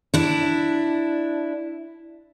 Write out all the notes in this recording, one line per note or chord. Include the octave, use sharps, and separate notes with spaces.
D4 E4